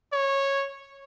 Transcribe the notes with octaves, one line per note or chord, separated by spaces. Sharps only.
C#5